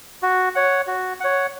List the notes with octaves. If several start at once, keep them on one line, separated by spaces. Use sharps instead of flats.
F#4
C#5 F#5
F#4
C#5 F#5